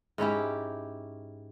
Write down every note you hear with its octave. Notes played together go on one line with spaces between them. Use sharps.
G#2 C#4 E4 G4